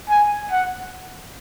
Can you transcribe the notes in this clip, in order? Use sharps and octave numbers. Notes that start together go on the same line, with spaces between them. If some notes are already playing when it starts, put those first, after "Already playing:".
G#5
F#5